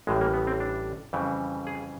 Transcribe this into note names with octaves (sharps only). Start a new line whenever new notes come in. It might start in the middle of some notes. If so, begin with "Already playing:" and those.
A1 A2 E3 G3 G#3
A#3
B3
C4
D4
F2 C#3 E3 G3
G#4